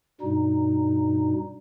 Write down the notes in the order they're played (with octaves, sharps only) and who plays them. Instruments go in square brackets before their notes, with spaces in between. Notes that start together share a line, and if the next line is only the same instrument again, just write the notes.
[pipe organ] G2 B2 G3 D#4